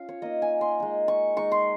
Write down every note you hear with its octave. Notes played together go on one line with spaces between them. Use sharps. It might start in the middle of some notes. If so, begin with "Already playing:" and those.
Already playing: C#4 F4 F5
C#5
A#3 D#4 D#5
G#5
C6
G#3 D#4
C#6
G#3 D#4 C#6
C6